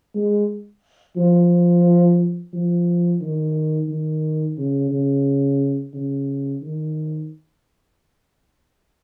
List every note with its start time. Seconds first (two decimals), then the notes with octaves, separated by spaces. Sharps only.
0.15 G#3
1.16 F3
2.53 F3
3.21 D#3
3.89 D#3
4.57 C#3
4.91 C#3
5.93 C#3
6.62 D#3